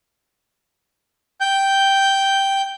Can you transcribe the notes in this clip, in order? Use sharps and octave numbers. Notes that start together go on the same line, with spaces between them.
G5 G6